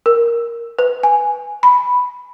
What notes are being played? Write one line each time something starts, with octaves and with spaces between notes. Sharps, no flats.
A#4
B4
G#5
B5